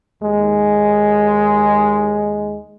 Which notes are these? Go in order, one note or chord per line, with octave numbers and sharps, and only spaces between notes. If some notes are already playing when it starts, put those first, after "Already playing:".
D#2 G#3